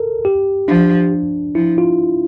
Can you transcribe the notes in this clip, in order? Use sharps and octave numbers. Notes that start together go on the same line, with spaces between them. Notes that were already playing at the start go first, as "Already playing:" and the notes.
Already playing: A4 A#4
G4
F3 D4
F3 E4
F4